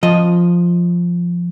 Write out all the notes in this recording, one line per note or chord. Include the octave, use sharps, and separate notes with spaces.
F3 D#5